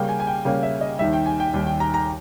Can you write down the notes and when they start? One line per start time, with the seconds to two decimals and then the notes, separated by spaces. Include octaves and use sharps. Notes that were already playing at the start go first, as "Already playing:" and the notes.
Already playing: C#3 G3 A#3 C#4 G5
0.09 G#5
0.20 G#5
0.27 G5
0.45 C#3 G3 A#3 C#4 G5
0.63 E5
0.81 D#5
0.99 D#2 D#3 G3 E5
1.13 G5
1.26 G#5
1.40 G5
1.54 D#2 D#3 G3
1.67 G5
1.80 A#5
1.94 A#5